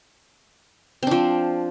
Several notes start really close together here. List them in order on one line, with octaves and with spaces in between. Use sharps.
C4 D4 F3